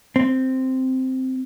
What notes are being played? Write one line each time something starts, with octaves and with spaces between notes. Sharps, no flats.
C4